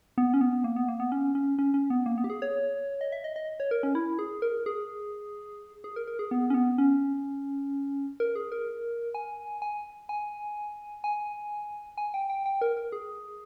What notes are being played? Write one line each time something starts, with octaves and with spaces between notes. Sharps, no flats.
B3
C#4
B3
A#3
B3
A#3
B3
C#4
C#4
C#4
C#4
B3
A#3
B3
G4
G#4
C#5
D#5
E5
D#5
D#5
C#5
A#4
C#4
E4
G#4
A#4
G#4
G#4
A#4
A#4
G#4
B3
C#4
B3
C#4
A#4
G#4
A#4
G#5
G#5
G#5
G#5
G#5
G5
G5
G5
A#4
A#4
G#4